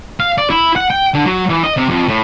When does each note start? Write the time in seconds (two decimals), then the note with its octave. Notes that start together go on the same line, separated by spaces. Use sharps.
0.20 F5
0.38 D5
0.50 E4
0.76 F#5
0.90 G5
1.14 D3
1.26 F#3
1.49 E3
1.63 D#5
1.77 C3
1.89 F2
2.08 A2